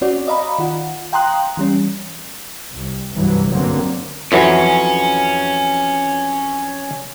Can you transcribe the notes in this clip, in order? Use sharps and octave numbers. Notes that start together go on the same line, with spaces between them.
C4 C#4 F#4 C#5 D5
D5 D#5 F5 A#5 B5
D#3 F4 F#5
F5 G5 A#5 C6 D#6 F#6
E3 G3 C#4
C2
C2 G2 E3 F#3
G2 D3 F#3 A#3 C4
F2 E3 F#3 C#4